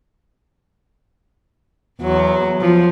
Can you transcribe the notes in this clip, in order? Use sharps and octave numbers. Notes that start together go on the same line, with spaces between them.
E2 F#3
F3